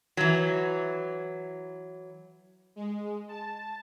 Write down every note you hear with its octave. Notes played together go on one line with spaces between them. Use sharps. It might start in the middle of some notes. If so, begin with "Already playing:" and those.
E3 F#3
G#3
A5